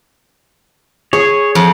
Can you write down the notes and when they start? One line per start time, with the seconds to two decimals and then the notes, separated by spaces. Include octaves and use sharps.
1.13 G#4 C#5
1.55 F2